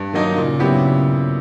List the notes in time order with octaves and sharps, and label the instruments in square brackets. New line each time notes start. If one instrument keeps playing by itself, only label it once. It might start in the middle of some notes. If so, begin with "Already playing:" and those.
Already playing: [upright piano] G2
D#3 F#3 A#3 D#4
[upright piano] A#2 [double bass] C#3
[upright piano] F#3 B3 E4 G4